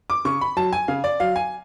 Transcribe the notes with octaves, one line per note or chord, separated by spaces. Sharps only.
D6
C#3 C#6
B5
F#3 A5
G#5
C#3 F5
D5
F#3 F5
G#5